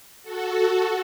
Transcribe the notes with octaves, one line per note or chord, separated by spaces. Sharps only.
F#4 A4